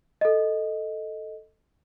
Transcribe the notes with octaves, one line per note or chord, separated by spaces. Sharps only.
A4 D#5